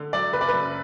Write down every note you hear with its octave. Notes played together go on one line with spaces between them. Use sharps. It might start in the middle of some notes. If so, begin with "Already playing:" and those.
Already playing: D3
F#3 D5
F#1 B4
D5
F#2 B4